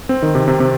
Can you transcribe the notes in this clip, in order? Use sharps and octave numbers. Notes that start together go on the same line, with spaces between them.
C4
D#3
C3
C3
C3